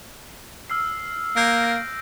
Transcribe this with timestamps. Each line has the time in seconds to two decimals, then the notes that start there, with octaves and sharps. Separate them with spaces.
0.70 E6 F6 C7
1.36 A#3 G6 A#6 D7
1.64 A#6